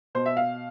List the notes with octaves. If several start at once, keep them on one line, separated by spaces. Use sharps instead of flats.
B2 C5
E5
F5